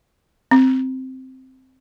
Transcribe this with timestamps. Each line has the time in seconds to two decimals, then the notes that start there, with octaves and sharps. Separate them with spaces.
0.51 C4